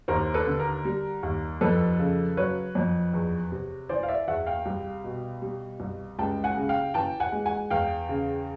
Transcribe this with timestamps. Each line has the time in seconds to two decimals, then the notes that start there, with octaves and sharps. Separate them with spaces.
0.08 D#2 A#4 C5
0.34 A4 B4
0.47 D3
0.59 A#4
0.85 G3
1.23 D#2
1.61 F2 A4 B4
1.99 C#3
2.37 F#3 B4 C#5
2.75 F2
3.14 E2
3.52 C3
3.89 E3 C5 D5
4.03 F5
4.08 D5 E5
4.28 E2 E5 F#5
4.46 F5 G5
4.66 C2
5.04 B2
5.42 G3
5.80 C2
6.19 C#2 G5 A5
6.44 F#5 G#5
6.57 C#3
6.69 F5 G5
6.94 E3 G5 A5
7.20 F#5 G#5
7.32 G#3
7.46 F#5 G#5
7.70 E2 F5 G5
8.09 C#3